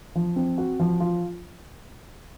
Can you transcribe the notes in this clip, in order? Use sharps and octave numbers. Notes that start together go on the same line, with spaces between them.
F3
C4
F#4
F3
F4